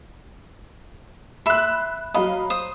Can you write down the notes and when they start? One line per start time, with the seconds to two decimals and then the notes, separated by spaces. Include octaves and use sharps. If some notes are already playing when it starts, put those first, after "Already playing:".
1.46 E5 B5 C6 F#6
2.14 F#3 D#5 F5 B5
2.50 C5 D#6